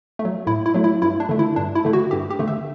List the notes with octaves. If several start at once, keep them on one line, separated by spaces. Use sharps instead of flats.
A3
F#3
A2 E4
E4
F#3 A3
E4
G2 E4
D4
D3 A3
E4
G2 D4
E4
D3 A3
F#4
G2 G4
G4
D3 A3
E5